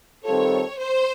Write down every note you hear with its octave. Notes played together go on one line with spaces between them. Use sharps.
D#3 G3 C4 F4 A4 C#5
C5